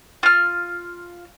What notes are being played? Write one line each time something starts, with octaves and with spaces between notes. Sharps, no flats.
F4 F6